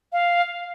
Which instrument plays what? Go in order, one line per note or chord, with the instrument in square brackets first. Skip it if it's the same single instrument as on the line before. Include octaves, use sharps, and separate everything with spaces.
[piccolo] F5